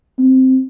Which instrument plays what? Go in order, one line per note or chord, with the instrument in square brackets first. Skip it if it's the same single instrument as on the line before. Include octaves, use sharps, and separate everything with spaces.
[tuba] C4